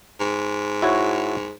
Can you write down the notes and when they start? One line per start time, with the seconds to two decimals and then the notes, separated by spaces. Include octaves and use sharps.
0.20 G#2
0.82 E4 F#4 C#5